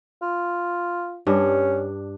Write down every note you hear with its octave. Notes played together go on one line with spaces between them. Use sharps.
F4
G2 C#4 D4